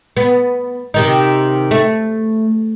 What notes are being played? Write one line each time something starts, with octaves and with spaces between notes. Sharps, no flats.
B3
C3 D#3 D#4
A3